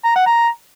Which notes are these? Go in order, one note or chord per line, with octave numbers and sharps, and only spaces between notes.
A#5
F#5
A#5